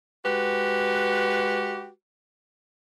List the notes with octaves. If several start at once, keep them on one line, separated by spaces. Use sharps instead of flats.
G#3 F#4 G4 B4